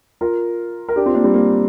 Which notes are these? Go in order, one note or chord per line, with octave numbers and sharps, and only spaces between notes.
F4 A#4
A#4
D4 G4
C4 F4
A#3 D4
G3 C4
A#3